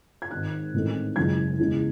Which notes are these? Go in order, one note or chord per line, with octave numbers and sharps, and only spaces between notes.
G#6
G#1 G#2 D#3 F#6
A1 G#2 D#3 A3 C4
F#1 F#2 E3 G#3 G#6
E2 C#3 G#3